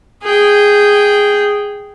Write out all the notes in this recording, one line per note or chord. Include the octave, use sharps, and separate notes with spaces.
G#4 G5